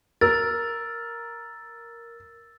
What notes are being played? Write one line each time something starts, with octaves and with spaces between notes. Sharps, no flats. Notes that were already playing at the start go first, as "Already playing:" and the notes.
A#4 E6 A6